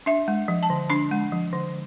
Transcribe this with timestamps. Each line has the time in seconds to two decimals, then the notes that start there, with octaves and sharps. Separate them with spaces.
0.06 D4 E5
0.28 G#3
0.48 F3
0.63 A5
0.70 D3
0.90 D4 B5
1.11 G#3
1.32 F3
1.53 D3